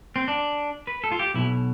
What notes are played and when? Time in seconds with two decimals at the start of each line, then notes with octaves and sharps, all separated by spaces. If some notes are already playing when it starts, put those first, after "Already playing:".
0.16 C4
0.28 D4
0.87 B4
1.04 A4
1.11 F4
1.19 G4
1.34 B1 B2 E4